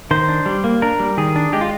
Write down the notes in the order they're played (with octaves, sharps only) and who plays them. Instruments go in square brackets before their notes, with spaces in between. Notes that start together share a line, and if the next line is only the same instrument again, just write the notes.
[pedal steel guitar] D#3 C5
D4
G3
A#3
D4 A#4
G3
D#3 G#4
D4
G#3 G4
F4